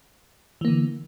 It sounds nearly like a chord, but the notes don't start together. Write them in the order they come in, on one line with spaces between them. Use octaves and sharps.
E3 A#3 D3